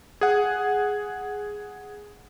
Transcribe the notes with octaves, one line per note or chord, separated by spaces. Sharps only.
G#4 F#5